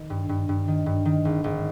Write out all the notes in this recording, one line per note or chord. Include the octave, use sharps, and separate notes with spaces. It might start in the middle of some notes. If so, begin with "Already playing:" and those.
Already playing: D#3
G2
G2
G2
D#3
G2
D#3
G#1
G#1